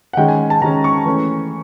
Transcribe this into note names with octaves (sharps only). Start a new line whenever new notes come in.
F#5
D#3 G#3 C#4 G5
G#5
A5
D#3 G#3 C#4 A#5
C#6
E3 A3 C#4